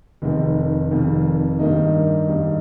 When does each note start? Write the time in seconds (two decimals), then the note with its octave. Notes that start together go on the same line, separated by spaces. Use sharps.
0.22 F1 F2 D#3
0.91 F1 F2 D#3
1.59 G2 D#3 A#3 D#4
2.28 G2 D#3 A#3 D#4